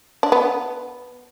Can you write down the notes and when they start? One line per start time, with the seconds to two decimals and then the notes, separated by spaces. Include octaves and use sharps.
0.23 D4
0.32 B3